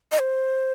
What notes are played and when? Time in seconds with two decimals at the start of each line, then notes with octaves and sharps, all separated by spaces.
0.12 D#5
0.19 C5